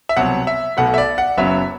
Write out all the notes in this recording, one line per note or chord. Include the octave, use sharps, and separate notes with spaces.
E5
C2 B2 F#3 C4 F#5
E5
B1 B2 A3 F#5
E5
D5
F#5
F#1 F#2 F#3 B3 E5